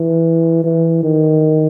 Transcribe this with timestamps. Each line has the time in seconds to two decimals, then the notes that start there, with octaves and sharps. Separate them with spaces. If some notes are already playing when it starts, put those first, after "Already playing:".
Already playing: E3
0.64 E3
1.03 D#3